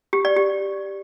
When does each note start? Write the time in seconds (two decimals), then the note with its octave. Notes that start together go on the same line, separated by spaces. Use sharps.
0.13 G4
0.25 D5
0.36 G4